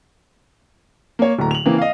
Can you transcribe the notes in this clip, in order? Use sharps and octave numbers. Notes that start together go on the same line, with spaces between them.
A#3 C#5
D1 A3 A#5
F7 F#7
C#3 E3 A#3 C4
D#5 F5